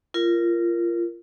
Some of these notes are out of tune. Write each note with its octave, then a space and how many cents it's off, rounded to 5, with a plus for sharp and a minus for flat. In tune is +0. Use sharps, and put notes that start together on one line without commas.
F4 -25 A#4 +0